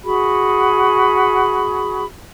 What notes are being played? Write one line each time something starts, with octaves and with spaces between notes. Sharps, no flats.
F#4 G#4 B5